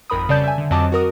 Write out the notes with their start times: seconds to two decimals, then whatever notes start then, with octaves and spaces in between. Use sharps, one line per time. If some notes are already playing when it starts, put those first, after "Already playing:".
0.10 G#1 F2 A#4 B5 D#6
0.29 C#3 G3 D5 A5 G6
0.43 E5 G#5
0.58 D3
0.71 F2 F#3 C4 D#5 A5 D6
0.92 F#4 A#4 D#6